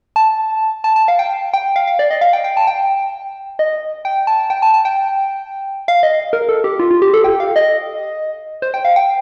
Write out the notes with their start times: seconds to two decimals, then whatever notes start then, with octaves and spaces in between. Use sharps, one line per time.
0.16 A5
0.84 A5
0.96 A5
1.08 F5
1.19 G5
1.54 G5
1.76 F5
1.87 F5
1.99 D5
2.11 D#5
2.21 F5
2.33 G5
2.44 G5
2.57 A5
2.67 G5
3.59 D#5
4.05 G5
4.27 A5
4.50 G5
4.62 A5
4.74 A5
4.85 G5
5.88 F5
6.03 D#5
6.33 A#4
6.49 A4
6.64 G4
6.79 F4
6.91 F4
7.02 G4
7.14 A4
7.24 G5
7.40 F5
7.56 D#5
8.62 C5
8.74 G5
8.85 F5
8.96 G5